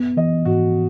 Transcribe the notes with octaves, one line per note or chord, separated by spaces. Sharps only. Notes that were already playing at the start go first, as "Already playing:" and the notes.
Already playing: B3
E3 D#5
G#2 F#4